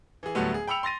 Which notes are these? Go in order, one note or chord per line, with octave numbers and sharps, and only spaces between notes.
E3 G#4
D2 A2 F#3 G3 A3 B3
G#4
G5 B5 E6 C#7 F7
C6 A6 A#6 D#7